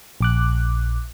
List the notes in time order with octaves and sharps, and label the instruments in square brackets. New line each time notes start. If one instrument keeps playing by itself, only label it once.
[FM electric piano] A#1 D6 F#6